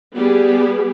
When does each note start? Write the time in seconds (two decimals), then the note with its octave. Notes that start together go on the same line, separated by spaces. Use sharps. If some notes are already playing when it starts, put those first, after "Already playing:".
0.12 G3 B3 G4 G#4